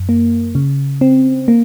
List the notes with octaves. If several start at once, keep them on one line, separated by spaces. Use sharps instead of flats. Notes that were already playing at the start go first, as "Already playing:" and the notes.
Already playing: F#2
A#3
C#3
C4
A#3